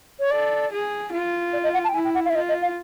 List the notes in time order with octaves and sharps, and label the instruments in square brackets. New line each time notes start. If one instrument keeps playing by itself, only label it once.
[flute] C#5
[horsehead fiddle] A4 [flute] D5
[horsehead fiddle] G#4
F4
[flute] D5
D#5
F#5
A5
G5
[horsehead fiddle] E4 [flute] G#5
[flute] G5
F#5
F5
E5
[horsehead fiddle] F4 [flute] D#5
[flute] D#5
F5